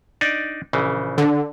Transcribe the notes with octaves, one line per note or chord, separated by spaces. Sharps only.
D4 D#4 D5
A#1 C#3 E3
D3